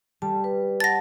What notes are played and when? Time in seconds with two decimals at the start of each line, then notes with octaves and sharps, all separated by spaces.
0.22 G3 A5
0.44 B4
0.80 F#5 A5 A6 A#6